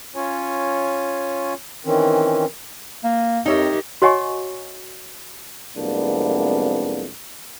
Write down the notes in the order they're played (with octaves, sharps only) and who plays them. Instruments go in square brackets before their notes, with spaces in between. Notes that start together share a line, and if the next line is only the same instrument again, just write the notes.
[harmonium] C#4 F4 C#5 G#5
D#3 E3 C4 C#4
[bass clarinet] A#3
[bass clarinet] F2 [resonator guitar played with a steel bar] D#4 C#5 E5 [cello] G4 A#4
[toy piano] F#4 C#5 D#5 F#5 G#5 C#6
[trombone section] C2 F2 G#3 A#3 B3 D4